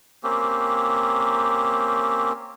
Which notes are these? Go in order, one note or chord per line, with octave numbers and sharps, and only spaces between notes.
A#3 C4 C#4 G4